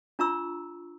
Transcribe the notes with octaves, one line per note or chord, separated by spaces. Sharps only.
D4 F4 A#5 C#6 E6